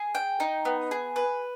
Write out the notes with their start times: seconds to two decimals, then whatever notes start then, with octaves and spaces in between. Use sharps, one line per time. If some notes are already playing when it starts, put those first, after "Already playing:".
Already playing: G#4
0.15 G5
0.40 D#4
0.65 B3
0.91 G#4
1.16 B4